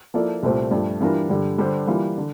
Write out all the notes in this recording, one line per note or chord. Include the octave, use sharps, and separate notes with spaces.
F3 A#3 E4 A4 D5
C2 A#2 A3 C4 G4
G2 F3 A3
E3 G3 D4 F4 A#4
G2 D3 G3
D3 G3 D4 G4 C5
E3 G3 A#3 F4
D3